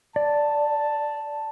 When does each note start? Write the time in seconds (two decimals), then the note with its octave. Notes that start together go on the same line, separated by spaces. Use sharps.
0.16 D5 A5